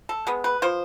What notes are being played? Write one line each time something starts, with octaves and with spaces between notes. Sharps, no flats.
A4
G#3 B3
B4
F3 C5